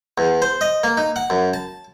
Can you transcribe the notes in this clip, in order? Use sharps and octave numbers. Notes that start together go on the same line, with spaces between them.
E2
C5
D#5
A#3
D#4
F#5
F#2
A5